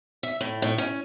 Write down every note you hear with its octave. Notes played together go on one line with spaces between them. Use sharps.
E5
A2
A2
C#4